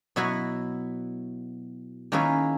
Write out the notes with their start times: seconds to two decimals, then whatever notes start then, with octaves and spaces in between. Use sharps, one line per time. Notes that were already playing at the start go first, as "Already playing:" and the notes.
0.16 B2 F#3 E4 F#4 B4 C#5
2.12 D#3 A#3 C#4 E4 G#4 B4